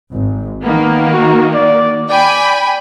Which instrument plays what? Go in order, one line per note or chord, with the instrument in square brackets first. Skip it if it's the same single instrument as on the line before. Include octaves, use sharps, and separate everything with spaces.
[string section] G#1
[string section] D#3 A#3 [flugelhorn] B3
[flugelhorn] F#4
D5
[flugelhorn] D5 [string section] G5 G#5 B5